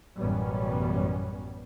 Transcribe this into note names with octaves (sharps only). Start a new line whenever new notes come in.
A1 F#2 B2 G3 B3 C#4